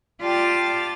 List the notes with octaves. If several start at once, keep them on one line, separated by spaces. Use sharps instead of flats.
F4 G4 D5 G5 A5 A6